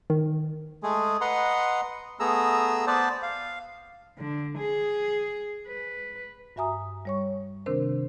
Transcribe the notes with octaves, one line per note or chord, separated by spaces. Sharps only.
D#3
G#3 A3 G#4
B4 D#5 F#5 A#5 C6
A3 B3 G#4 A#5 E6
B3 B4 C5 D5 A5
F5
D3
G#4
B4
G2 F#4 E5 G#5 A#5 D#6
G3 C#5 C#6
C3 D#3 C4 D4 A#4 C5